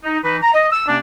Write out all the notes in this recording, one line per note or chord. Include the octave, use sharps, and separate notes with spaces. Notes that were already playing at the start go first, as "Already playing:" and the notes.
D#4
E3 D#4 B4
A#5
D#5
E6
C3 A#3 C#4 D4